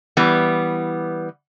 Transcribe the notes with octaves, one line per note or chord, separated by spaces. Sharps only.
E3 G3 B3